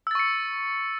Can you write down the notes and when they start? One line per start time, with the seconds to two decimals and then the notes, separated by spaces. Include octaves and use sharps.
0.07 E6
0.11 A6
0.15 C#6
0.19 C#7